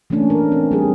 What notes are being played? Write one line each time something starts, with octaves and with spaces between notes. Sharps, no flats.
E3 A3 A#3 C#4 D4
A#4
C4
G3 G#4